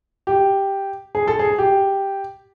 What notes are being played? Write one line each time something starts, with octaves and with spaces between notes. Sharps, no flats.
G4
G#4
A4
G#4
G4